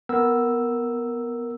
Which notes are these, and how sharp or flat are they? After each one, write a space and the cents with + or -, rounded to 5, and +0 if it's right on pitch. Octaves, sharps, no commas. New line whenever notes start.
B3 +0 A#4 +0 E6 +0